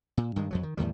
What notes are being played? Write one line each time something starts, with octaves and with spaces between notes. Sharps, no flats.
A#2
G2 D#3 G#3
F2 F3 F#3
D#3
E2 A2 D#3 G3